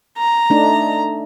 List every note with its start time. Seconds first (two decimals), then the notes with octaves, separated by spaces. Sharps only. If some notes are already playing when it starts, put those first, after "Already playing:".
0.18 A#5
0.50 A3 D4 D#4